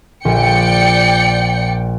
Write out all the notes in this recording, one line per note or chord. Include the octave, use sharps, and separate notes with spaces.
A#1 D5 G5 C#7